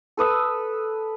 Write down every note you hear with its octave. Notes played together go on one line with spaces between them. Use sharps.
A4 B4 D#6 E6